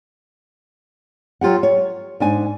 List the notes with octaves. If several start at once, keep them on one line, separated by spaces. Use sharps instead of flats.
F#3 F4 G4 F#5
C#5
G#2 D4 G#5